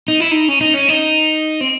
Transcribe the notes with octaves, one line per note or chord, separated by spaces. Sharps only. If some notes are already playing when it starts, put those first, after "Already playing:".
D#4
E4
D#4
C#4
D#4
C#4
D#4
C4